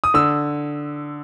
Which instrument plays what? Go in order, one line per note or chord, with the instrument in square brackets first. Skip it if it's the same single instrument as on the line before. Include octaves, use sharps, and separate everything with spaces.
[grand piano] D#6
D3 E6